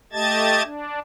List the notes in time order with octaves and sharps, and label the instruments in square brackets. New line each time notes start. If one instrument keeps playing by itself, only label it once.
[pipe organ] A3 G4 D#5 A5 G#6 A6
D4